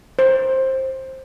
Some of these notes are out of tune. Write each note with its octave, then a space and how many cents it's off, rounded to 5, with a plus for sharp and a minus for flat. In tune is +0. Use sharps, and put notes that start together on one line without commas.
C5 +15